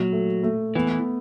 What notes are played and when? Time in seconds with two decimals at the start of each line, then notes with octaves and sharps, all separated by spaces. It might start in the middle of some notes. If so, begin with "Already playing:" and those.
Already playing: A#2 F#3
0.12 A3
0.43 A3
0.75 E3 B3